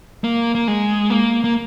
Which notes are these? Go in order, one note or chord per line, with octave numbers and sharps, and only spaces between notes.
A#3
A#3
G#3
A#3
A#3